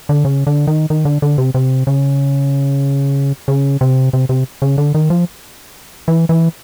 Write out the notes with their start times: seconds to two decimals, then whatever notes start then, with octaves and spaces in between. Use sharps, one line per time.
0.09 D3
0.25 C#3
0.47 D3
0.67 D#3
0.90 D#3
1.05 D3
1.22 D3
1.38 C3
1.55 C3
1.87 C#3
3.48 C#3
3.81 C3
4.13 C3
4.29 C3
4.62 C#3
4.78 D3
4.95 D#3
5.10 F3
6.08 E3
6.29 E3